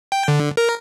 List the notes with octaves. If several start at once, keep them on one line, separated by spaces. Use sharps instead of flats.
G5
D3
A#4